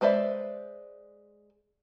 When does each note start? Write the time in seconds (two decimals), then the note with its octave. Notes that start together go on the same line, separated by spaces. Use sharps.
0.01 G#3 B4 C5 D5 E5